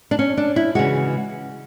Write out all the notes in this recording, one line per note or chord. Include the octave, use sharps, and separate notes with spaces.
D4
C#4
D4
E4
C#3 E3 G#3 F#4